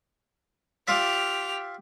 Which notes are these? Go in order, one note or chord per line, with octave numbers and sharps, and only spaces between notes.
F4 G4 D5 E5 F7